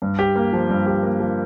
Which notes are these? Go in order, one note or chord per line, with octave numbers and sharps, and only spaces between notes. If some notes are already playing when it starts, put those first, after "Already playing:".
G2
G4
A#3
F3
G2
G4
A#3
F3